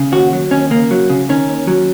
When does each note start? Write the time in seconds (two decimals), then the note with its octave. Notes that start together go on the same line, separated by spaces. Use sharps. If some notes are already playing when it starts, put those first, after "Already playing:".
Already playing: C#3
0.13 D#2 F#4
0.33 F#3
0.51 D#2 C#4
0.70 C#3 A#3
0.91 F#3
1.10 C#3
1.29 D#3 C#4
1.48 D#2
1.67 F#3